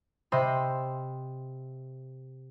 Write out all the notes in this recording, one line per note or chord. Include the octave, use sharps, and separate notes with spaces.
C3 C5 D#5 E5 B5